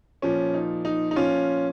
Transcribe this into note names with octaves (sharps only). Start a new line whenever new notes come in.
A#2 F3 C#4
D#4
D#4
D#4
A#2 F3 C#4 F4